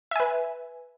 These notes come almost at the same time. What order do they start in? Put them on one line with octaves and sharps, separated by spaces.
E5 G#5 B4